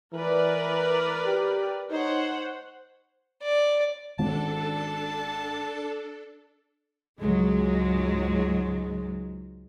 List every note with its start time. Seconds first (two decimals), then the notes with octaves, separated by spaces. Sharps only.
0.13 E3 A#4 B4 D5
1.26 G4
1.91 D#4 C5 C#5 F#5
3.43 D5
4.19 G#1 D#3 C#4 D4 A4 A5
7.20 C#2 G#2 F#3 G#3